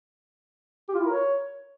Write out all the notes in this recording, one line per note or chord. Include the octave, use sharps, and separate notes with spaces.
G4
F4
E4
A#4
C#5